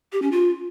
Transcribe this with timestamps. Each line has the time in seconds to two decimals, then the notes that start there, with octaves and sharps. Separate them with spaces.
0.12 G4
0.22 C#4
0.32 F4